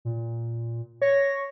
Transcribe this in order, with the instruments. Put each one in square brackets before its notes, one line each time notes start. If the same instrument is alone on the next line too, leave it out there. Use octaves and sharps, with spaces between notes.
[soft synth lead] A#2
[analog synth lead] C#5 [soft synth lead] A#6